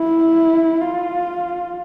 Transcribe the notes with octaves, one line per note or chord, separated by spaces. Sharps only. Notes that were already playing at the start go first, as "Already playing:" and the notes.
Already playing: E4
F4